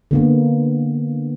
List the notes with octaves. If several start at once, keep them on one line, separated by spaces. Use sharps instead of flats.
D3 A#3 B3